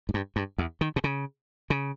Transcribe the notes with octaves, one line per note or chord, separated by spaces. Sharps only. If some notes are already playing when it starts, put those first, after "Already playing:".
G#2
G2
G2
E2
D#3
B2
C#3
C#3